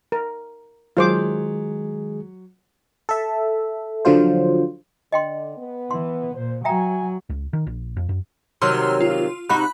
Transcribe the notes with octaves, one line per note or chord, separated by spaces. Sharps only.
A#4
D#3 F#3 G#3 F4 G#4 C5 D6
A4 E5
D3 F3 F#3 F4 C5
D3 D#5 G5 C6
B3
E3 C6
A#2 C5
F#3 E5 G5 G#5 A#5
C#2
D#3
A#1
F2
F#2
C3 D#3 F#3 C6 E6 F6
F4
C3 D#4 F#4 B5 F#6